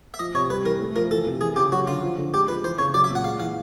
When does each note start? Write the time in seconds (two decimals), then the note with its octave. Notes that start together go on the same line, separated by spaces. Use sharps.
0.14 E5
0.19 F3 D#5
0.34 C3 C#5
0.50 G3 B4
0.65 E3 A#4
0.81 A3
0.96 F3 A#4
1.11 E3 A4
1.26 C3
1.41 E3 G#4
1.56 C#3 G4
1.72 F#3 F#4
1.87 D3 F4
2.03 F3
2.18 D3
2.33 G#3 G4
2.48 F3 B4
2.63 E3 C5
2.79 C#3 C#5
2.94 F#3 D5
3.04 E5
3.10 A#2
3.15 F#5
3.24 G#3 F5
3.40 E3 F5